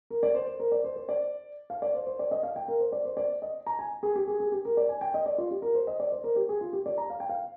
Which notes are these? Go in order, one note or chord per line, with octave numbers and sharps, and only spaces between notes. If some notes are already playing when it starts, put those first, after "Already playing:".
A#4
D5
C5
C5
A#4
D5
C5
C5
D5
F5
D5
C5
C5
D5
D#5
F5
G5
A#4
C5
D5
C5
D5
D#5
A#5
G#5
G#4
G4
G#4
G#4
G4
A#4
D5
G#5
G5
D#5
D5
F4
G4
A#4
C5
D#5
D5
C5
A#4
G4
G#4
F4
G4
D5
A#5
F5
G5
F5